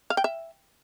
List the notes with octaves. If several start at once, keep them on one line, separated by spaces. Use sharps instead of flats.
F5
G5
E5